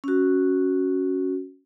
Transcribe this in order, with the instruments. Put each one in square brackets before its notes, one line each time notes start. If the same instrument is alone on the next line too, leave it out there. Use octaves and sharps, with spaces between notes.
[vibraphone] C#4 F#4